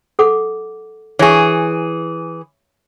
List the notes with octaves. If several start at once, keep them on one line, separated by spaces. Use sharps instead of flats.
A4 F#5 D6
E3 G#4 C#5 E5 C#6